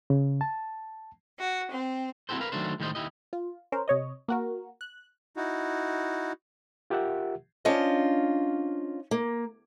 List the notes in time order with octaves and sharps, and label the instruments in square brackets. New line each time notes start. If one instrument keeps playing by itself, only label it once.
[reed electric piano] C#3
A5
[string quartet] F#4
C4
[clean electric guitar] C4 E4 F#4 G4 A4 C5
A#4 B4 F5
D#3 F#3 A3 D4 C5
A2 D#3 G3 G4 C5 D#5
D#2 E4 G4 D#5
[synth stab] F4
C#4 A#4 C5
C3 C#5 D#5
A#3 F#4 A#4
F#6
[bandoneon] D#4 E4 F#4
[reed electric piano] F4 G4 A#4 E5 F#5
[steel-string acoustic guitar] C#4 D4 F4 C5 D#5
A#3